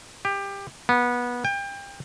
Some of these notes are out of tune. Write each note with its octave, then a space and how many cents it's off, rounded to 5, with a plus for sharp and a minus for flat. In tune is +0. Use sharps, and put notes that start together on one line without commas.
G4 +20
B3 -20
G5 +30